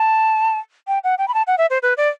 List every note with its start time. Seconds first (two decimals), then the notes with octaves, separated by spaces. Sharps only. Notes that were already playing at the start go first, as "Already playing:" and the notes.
Already playing: A5
0.88 G5
1.04 F#5
1.18 G5
1.28 B5
1.34 A5
1.47 F#5
1.58 E5
1.70 C5
1.82 B4
1.97 D5